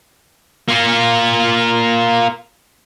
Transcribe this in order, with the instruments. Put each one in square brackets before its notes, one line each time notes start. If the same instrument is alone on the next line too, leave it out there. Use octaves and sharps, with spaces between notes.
[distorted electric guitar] A#3 F4